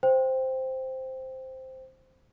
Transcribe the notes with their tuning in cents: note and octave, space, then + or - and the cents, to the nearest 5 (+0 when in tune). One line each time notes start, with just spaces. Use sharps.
C5 +0 G5 +0